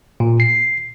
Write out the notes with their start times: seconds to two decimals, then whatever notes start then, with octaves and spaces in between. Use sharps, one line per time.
0.20 A#2
0.40 C7